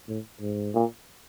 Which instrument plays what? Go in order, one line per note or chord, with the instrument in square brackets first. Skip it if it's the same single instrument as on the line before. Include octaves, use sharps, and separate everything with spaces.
[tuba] A2
G#2
[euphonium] A#2